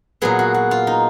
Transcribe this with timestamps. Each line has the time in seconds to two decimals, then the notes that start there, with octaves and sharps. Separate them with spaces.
0.22 A#2 F#3 B3 G#4
0.39 F#4
0.54 F#4
0.71 F4
0.87 D#4